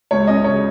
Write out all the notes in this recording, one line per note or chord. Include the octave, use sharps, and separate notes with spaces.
C#2 C#5
C#4 D#5
C#3 C#5